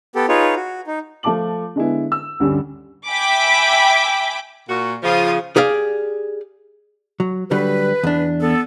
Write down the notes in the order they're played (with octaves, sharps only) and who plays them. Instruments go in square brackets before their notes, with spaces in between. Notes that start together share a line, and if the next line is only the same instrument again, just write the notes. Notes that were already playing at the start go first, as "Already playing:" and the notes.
[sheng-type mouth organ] B3 G4 A4
D#4 F4 G#4 B4 C#5
F#4
D#4
[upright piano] F3 A3 F4 A5 D6 F#7
D3 G#3 B3 E4
E6
D2 G2 D3 G3 C#4
[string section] E5 G5 G#5 B5 D6
[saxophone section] A#2 F#4
[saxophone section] C#3 F3 [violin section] F4 D#6
[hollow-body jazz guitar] G4 G#4 D5 F5
F#3
[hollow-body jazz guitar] D3 F#3 G3 [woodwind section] B4
[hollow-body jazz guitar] E2 D4
[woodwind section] B3 A4